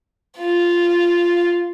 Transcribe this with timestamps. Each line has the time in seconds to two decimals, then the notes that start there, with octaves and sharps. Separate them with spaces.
0.38 F4